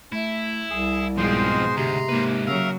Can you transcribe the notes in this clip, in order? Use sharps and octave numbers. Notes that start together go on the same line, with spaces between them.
A3 E4
C2 G#4
G#2 B2 F3 G#3 C4 C5 C6
D2 C3 A#5 C6
G#2 A#3 B4
C#3 F#3 A#4 E5 F5